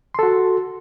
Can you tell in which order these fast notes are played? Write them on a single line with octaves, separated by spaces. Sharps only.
C6 A4 F#4